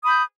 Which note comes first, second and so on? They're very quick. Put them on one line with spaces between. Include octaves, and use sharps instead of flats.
D#6 B5 G6